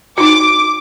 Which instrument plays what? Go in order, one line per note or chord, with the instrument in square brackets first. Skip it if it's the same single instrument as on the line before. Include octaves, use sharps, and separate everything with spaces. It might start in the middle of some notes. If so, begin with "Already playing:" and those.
[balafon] D#4 F#4 [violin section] D6